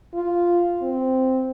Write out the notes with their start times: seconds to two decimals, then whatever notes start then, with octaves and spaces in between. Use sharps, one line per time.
0.14 F4
0.82 C4